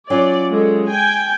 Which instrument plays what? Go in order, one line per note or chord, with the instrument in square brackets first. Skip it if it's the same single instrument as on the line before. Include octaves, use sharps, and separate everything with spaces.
[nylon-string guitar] F#3 C#4 F4 [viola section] D5
[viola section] G#3 A4
G5 G#5